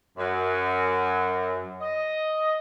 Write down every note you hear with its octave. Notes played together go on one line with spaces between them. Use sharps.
F#2
D#5